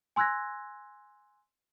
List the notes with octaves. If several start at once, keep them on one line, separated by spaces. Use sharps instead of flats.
G#5 C6 E6 F#6 G#6 A#6